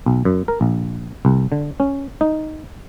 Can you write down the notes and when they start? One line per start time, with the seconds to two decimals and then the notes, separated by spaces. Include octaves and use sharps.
0.06 B1
0.25 F#2
0.48 A#4
0.61 A#1
1.25 C2
1.52 D3
1.80 C#4
2.21 D#4